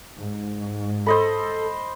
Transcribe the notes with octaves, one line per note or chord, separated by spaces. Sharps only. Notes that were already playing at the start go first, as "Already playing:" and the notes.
G#2
A4 C5 D#5 B5